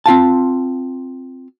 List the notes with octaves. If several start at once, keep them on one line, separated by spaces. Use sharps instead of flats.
C4 F4 F5 A5